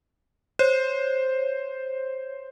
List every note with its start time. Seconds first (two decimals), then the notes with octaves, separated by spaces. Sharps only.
0.59 C5 C#5